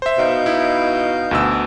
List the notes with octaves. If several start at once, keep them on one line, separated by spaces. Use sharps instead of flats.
C5 E5
B2 D#4 F5 G6
E4
D2 B2 E6